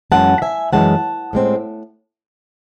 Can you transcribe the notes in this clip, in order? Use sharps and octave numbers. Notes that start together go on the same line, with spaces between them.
F#2 E3 G#3 C#4 F#5 A5
E5 G#5
F#2 E3 G#3 C#4 F#5 A5
A2 G#3 C4